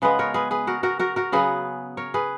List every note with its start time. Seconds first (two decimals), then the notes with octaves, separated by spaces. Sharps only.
0.02 C#3 G#3 B3 G#4 B4
0.19 A#4 C#5
0.34 G#4 B4
0.51 G#4 B4
0.67 F#4 A#4
0.83 F#4 A#4
0.99 F#4 A#4
1.16 F#4 A#4
1.32 C#3 F#3 B3 G#4 B4
1.97 A#4 C#5
2.14 G#4 B4